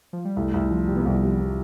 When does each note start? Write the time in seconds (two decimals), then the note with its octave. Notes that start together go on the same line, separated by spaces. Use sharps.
0.13 F3
0.25 G3
0.36 C2 A3
0.54 C2
0.71 F3
0.87 C3 G3
0.96 B3
1.01 A3
1.05 C2
1.18 G3
1.22 C3 F3
1.38 E3